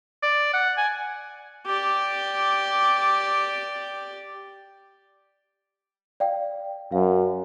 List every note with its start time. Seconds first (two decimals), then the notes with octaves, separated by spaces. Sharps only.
0.23 D5
0.53 F#5
0.78 G#5
1.66 G4 D5
6.20 D5 F5 G5
6.92 F#2 F5